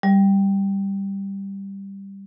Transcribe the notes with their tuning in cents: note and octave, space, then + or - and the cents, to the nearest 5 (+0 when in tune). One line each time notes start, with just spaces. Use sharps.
G3 +5